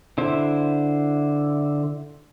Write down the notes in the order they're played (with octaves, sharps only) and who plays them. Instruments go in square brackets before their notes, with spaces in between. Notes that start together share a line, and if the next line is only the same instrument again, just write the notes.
[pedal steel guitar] D3 E4 C5